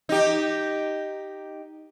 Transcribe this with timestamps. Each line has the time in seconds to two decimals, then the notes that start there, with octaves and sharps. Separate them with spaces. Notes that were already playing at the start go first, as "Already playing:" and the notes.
0.09 D#4 G4